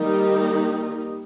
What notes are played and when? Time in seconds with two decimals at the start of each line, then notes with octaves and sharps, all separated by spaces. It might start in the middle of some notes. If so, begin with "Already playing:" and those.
Already playing: D#3 G3 A#3 D#4 G4